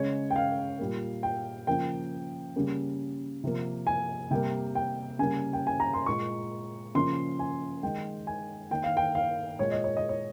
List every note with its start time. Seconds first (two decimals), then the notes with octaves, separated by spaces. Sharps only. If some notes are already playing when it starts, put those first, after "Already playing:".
Already playing: C#3 G#3 C#5
0.30 G5
0.36 F5
0.79 A#2 G3 A#3
1.23 G5
1.67 C#3 F3 A#3 G5
2.56 C#3 G3 A#3
3.44 C3 F3 A#3
3.87 G#5
4.31 C3 G3 A#3 G5
4.75 G5
5.19 C#3 G3 A#3 G#5
5.53 G5
5.67 G#5
5.80 A#5
5.93 C6
6.06 A#2 G#3 C#6
6.95 C#3 F3 A#3 C6
7.39 G#5
7.83 D#3 G#3 G5
8.27 G#5
8.71 D#3 A#3 G5
8.84 F5
8.97 G5
9.15 F5
9.59 A#2 G#3 C#5
9.72 D#5
9.84 C#5
9.97 D#5
10.09 C#5